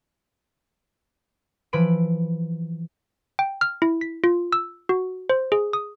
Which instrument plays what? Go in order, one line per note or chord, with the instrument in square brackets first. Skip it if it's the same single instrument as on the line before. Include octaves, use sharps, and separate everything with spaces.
[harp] E3 F3 B4 B5 D7
[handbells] G5
F6
E4
B6
F4
E6
F#4
C5
G#4
D#6